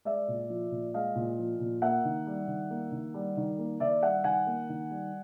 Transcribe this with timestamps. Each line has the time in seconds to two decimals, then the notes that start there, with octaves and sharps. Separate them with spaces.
0.05 G#3 D5 E5
0.28 A#2
0.50 F3
0.71 A#2
0.94 G#3 D#5 F5
1.15 A#2
1.38 F3
1.60 A#2
1.82 A#3 E5 F#5
2.05 D#3
2.27 G3
2.48 D#3
2.70 A#3
2.92 D#3
3.14 G3
3.37 D#3
3.58 A#3
3.80 D#3 D5 E5
4.02 G3 E5 F#5
4.24 D#3 F#5 G#5
4.47 A#3
4.69 D#3
4.91 G3